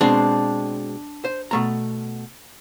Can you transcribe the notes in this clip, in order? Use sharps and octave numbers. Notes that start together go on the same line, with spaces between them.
B2 G#3 C4 D4
C5
B2 A3 A#5